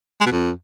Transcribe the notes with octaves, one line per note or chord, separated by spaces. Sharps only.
G#3
B2
F2